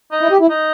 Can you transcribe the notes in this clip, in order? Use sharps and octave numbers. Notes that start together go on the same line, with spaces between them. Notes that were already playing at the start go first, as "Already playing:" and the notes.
D#4
E4
G4
E4
D#4